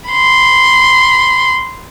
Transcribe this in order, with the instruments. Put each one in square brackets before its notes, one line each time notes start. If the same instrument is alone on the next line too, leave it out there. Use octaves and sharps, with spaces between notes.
[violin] B5 C6